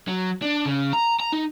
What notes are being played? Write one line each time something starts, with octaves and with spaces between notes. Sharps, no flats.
F#3
D4
C#3
A#5
A#5
D#4